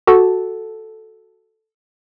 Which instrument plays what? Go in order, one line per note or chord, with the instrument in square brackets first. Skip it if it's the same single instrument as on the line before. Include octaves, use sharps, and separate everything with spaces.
[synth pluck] F#4 A4